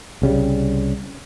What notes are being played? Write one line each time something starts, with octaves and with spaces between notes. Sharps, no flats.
C2 C#3 G3